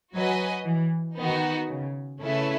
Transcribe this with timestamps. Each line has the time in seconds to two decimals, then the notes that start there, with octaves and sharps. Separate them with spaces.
0.14 F#3 F#4 B4 D#5 G#5
0.65 E3
1.17 D#3 B3 D#4 F#4
1.68 C#3
2.20 C#3 A3 C#4 E4 B4 E5